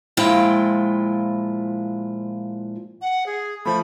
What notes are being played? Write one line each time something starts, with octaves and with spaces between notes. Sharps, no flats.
A#2 F3 G#3 E4 F4 G5
F#5
G#4
F3 A3 B5